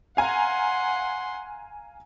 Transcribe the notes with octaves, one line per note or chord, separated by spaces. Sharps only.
F5 F#5 G#5 A#5 C6